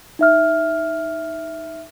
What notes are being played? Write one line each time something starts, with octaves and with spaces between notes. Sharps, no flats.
D#4 E5 F6